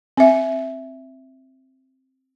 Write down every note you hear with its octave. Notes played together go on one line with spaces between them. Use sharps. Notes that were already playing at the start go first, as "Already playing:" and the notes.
C4 E5